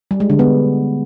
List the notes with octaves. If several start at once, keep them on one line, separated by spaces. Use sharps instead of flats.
G3
G#3
D3
B3